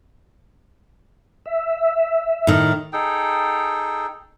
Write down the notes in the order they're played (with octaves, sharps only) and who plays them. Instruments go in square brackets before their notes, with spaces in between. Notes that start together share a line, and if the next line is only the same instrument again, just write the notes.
[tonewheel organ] E5
[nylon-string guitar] A2 D#3
[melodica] D#4 G#4 A4 G5